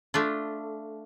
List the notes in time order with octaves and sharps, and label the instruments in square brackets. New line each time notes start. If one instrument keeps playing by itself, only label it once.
[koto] A3 D4 F4